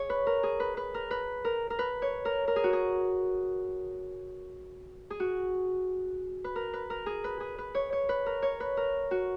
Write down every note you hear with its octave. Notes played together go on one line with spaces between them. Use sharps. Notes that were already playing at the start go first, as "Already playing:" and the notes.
Already playing: G#4 C#5
B4
A#4
G#4
B4
B4
A#4
B4
A#4
A#4
B4
C#5
A#4
A#4
G#4
F#4
G#4
G#4
F#4
B4
A#4
B4
A#4
G#4
B4
G#4
B4
C#5
C#5
B4
A#4
C#5
B4
A#4
F#4